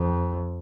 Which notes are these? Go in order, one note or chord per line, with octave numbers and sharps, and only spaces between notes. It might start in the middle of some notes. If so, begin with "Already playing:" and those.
Already playing: F2